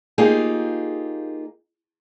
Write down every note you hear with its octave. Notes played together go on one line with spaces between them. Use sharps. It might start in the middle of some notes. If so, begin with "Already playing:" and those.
A#3 D#4 F4 G4 G#4